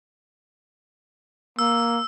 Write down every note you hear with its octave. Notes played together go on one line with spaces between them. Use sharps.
A#3 E6